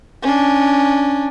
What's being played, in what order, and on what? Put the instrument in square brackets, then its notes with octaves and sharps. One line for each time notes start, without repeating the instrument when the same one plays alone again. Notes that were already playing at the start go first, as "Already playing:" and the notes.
[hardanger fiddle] C#4 D4